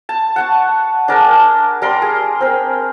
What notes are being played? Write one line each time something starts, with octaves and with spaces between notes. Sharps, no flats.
A5
F#5 A5 C#6
D4 G#4 A#4 A5
G3 A#4 C6
G#4
C4 A#4